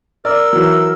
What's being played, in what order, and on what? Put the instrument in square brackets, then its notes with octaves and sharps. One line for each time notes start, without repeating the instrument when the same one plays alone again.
[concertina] A#4 [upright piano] D5 [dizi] E6
[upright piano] E3 F#3